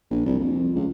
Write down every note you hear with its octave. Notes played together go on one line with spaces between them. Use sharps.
A#1
C2
F2
C#2